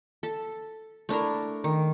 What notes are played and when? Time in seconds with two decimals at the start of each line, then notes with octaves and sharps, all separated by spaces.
0.23 A4
1.09 A3 D4 E4 A#4
1.64 D#3